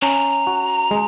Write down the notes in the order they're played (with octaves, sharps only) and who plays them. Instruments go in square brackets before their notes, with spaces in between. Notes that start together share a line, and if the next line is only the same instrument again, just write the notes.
[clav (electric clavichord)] C#4 [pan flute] A#5
[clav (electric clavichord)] F#4
G#3